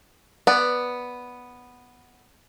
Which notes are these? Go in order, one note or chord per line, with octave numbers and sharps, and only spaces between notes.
B3 D5